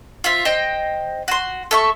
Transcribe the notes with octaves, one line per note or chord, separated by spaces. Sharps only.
F4 C5 E5
C5 D#5 G5
F#4 C6
A4 E5 C#6